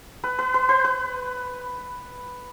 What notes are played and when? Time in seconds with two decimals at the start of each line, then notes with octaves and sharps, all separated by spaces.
0.24 B4
0.39 B4
0.54 B4
0.69 B4
0.84 B4